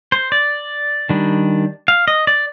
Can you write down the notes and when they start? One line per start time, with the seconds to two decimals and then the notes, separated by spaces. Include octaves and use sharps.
0.12 C5
0.32 D5
1.10 D#3 G3 D4
1.88 F5
2.08 D#5
2.27 D5